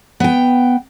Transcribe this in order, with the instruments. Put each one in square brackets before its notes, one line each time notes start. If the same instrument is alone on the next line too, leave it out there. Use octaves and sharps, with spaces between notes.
[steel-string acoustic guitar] B3 G5